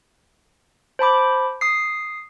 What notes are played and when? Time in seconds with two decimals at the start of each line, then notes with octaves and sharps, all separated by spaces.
0.99 C5 A5 B5 D6
1.61 D#6 C7